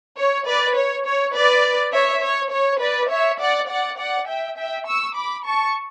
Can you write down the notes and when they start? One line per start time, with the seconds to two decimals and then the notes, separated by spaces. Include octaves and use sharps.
0.17 C#5
0.47 B4 D5
0.75 C#5
1.05 C#5
1.34 B4 D5
1.93 C#5 E5
2.22 C#5
2.52 C#5
2.81 B4 D5
3.11 C#5 E5
3.40 D5 F#5
3.69 D5 F#5
3.98 D5 F#5
4.28 E5 G5
4.57 E5 G5
4.87 C#6 E6
5.16 B5 D6
5.45 A5 C#6